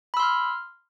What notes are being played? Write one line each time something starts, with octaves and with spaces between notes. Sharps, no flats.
B5 C6 E6 F6